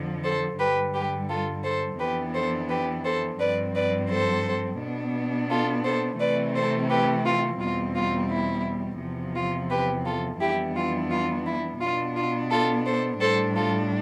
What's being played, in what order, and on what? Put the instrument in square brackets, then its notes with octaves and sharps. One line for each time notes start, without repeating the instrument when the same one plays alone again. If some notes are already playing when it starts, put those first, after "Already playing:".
Already playing: [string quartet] F2 D3 F3
A4 C5
G2 D3 G3 G4 B4
G4 B4
F4 A4
A4 C5
F2 E3 B3 D4 G4 B4
A4 C5
G4 B4
A4 C5
G2 F3 C4 B4 D5
B4 D5
A4 C5
B2 B3 D4
F4 A4
A4 C5
C3 E3 A3 C4 B4 D5
A4 C5
G4 B4
F4
E2 B2 G3 C4 F4
F4
E4
E2 C3 F3
F4
G4 B4
F4 A4
F2 E3 G3 B3 D4 E4 G4
F4
F4
E4
B2 B3 D4 F4
F4
F4 A4
A4 C5
A2 G3 D4 A4 C5
F4 A4